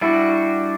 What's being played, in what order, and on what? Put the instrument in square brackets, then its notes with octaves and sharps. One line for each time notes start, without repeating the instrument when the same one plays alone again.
[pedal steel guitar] G3 D4 F#4 [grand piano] E4